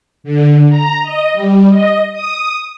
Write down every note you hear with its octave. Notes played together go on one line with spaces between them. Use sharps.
D3
A#5
D#5
G3
D#5
D#6